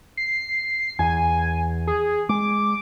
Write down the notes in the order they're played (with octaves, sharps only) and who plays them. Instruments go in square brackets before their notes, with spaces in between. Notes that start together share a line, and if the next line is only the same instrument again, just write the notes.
[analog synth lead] C7
[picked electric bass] E2 [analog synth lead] G#5
[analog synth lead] G#4
[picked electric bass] G#3 [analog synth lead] D6